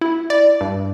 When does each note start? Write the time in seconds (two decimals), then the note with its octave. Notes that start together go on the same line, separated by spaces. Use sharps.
0.01 E4
0.30 D5
0.61 G2